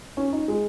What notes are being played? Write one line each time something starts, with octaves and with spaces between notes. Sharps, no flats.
C#4
D#4
G#3